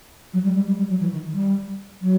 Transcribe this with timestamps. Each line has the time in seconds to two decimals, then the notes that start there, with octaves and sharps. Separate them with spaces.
0.33 F#3
0.43 G3
0.54 G3
0.66 G3
0.77 G3
0.89 F#3
1.00 E3
1.11 D#3
1.33 G3
2.01 F#3